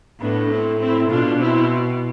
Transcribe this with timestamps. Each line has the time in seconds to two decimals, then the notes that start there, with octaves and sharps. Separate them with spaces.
0.20 A2 B3 D4
0.50 C4 E4
0.79 C4 E4
1.10 B2 D4 F4
1.40 C4 E4